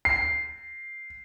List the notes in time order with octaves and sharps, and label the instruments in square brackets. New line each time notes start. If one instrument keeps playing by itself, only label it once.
[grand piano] C7